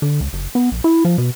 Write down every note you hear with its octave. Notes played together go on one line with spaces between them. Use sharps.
D3
C#2
F#1
B3
A#1
E4
F3
B2